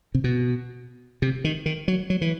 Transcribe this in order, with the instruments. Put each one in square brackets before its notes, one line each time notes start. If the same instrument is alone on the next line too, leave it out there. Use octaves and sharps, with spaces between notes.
[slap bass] C3
B2
C3
D#3
D#3
F#3
F#3
E3